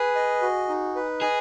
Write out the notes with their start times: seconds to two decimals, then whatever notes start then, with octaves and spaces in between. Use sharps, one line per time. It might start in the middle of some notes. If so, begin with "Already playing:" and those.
Already playing: G#4 B4
0.15 D#5
0.42 F#4
0.69 D#4
0.96 B4
1.21 G#4 D#5